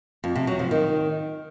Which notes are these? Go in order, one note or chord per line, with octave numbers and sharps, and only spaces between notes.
F2
C3
F#3
F3
D#3